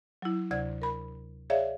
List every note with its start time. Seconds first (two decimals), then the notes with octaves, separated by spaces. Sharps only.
0.22 F#3 E4
0.51 D2 C3 D5 G#6
0.82 A#4 B5
1.50 G#4 C#5 D5 E5 F5